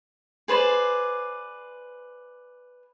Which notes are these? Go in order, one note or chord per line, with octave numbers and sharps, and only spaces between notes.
G#4 B4 C5 D5